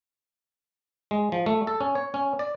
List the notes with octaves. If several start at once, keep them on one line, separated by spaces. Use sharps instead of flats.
G#3
F3
A3
A4
C#4
C#5
C#4
D5